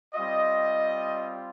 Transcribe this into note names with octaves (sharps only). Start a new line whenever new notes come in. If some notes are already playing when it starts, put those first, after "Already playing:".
G3 C4 F4 D#5